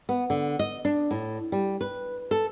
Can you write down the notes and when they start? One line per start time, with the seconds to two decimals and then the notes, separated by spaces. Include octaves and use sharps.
0.09 B3
0.30 D3
0.59 D#5
0.85 D4
1.11 A2
1.52 G3
1.81 B4
2.31 A4